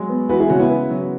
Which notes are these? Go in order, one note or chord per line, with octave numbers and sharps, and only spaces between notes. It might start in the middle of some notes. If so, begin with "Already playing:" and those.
Already playing: F#3 G#3
B3
E3 F#4 B4
E4 G#4
C#3 C#4 F#4
B3 E4
B4
F#3